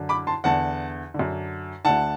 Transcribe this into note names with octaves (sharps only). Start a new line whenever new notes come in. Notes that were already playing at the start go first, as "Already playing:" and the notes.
Already playing: F#2 D3
B5 D6
A5 C6
E2 D3 F#5 A5
D3
F#2
D2 D3 F#5 A5